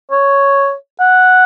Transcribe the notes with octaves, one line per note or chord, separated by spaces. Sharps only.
C#5
F#5